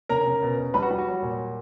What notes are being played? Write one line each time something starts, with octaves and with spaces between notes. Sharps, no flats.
C#3 A#4 A#5
C#3
B2
B2
G3 B4 B5
F#4 F#5
G3
F#4 F#5
F#3
A#2